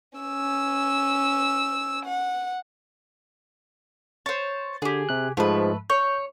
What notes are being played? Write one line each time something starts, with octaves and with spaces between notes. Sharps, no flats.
C#4 E6
F#5
C5 C#5 A6
D3 G4 G#4
C3 F#6
G#2 F3 G#3 A3 B4
C#5 G6